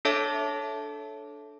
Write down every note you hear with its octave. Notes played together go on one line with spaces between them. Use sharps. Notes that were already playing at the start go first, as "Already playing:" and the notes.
D4 A4 C#5 E5 A5 D6